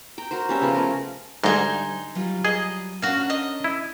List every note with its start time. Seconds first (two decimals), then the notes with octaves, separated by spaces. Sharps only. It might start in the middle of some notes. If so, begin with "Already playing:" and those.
0.18 G5 A#5
0.31 F#4 A#4 C5
0.49 G3 C#4 E5
0.61 C#3 F3 B3 F4
0.74 A3 A#4
1.44 D2 G#2 G3 D#4 C5 G#5
2.15 F#3 G3 F4
2.45 G#4 D#5
3.02 C#4 D4 F#4 A#4 F5
3.30 D#5
3.64 E4